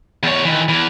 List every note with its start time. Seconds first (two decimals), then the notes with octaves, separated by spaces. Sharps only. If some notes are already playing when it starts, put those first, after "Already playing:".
0.23 E2 C#5
0.45 D#3 E3
0.69 E2 E3